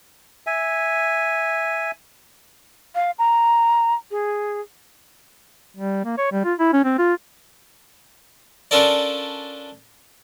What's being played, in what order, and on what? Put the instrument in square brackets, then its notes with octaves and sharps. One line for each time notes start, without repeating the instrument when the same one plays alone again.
[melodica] E5 G#5
[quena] F5
A#5
G#4
[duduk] G3
A#3
C#5
G3
F4
E4
C#4
C4
F4
[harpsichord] C#4 D4 F4 A4 A#4 D5